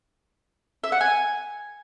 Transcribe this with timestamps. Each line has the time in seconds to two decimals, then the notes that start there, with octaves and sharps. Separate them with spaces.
0.84 E5
0.92 F#5
1.01 G#5